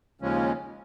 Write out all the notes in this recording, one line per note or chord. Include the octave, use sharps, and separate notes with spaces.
D#2 C#3 F3 G#3 C#4